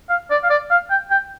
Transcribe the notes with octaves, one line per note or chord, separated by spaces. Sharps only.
F5
D5
F5
D5
F5
G5
G5